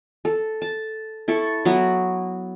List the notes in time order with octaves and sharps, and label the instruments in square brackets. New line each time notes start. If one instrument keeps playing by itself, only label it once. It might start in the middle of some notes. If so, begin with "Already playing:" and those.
[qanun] A4
A5
E4 A4 C#6
F#3 B3 E4